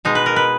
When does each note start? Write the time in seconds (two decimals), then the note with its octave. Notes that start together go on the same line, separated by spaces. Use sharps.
0.05 B2 G#3 D#4
0.15 B4
0.26 A#4
0.36 B4